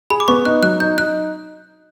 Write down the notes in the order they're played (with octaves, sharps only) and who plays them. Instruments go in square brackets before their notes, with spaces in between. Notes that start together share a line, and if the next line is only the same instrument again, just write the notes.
[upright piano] G#4 [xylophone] B5
[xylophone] D6
[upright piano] B3 [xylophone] C#6
[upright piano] D#4 [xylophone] F#6
[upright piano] F#3 [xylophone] F#6
[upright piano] D#4 [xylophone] G6
[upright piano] D#4 [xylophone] F#6